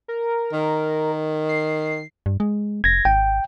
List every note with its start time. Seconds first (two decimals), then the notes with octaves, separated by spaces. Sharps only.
0.08 A#4
0.53 D#3
1.49 C7
2.26 G2
2.40 G#3
2.84 F1 G#6 A#6
3.05 G#1 G5